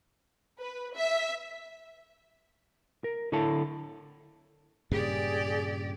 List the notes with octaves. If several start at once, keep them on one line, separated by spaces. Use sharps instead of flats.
B4
E5
A#4
D3 E4 A4 C#5 A5
G2 A#2 C#3 G4 G#4 D5